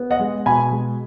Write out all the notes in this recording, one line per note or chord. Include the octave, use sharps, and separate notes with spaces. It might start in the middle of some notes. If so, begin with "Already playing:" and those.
Already playing: B3
D#5 F#5
G#3
B2 G#5 B5
G#3